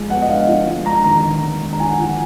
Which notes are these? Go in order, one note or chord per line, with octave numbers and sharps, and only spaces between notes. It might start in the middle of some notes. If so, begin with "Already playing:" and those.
Already playing: F3 G#3
B3 F#5
D#5
D4 F5
F3
G#3
D4 A#5
D#3 A#5
D#3
G#3
D4
A#5
F3 G#5
F#5
F3
F#5